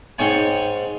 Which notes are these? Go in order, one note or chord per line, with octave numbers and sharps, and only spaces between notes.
G#2 C#5 G5 G#5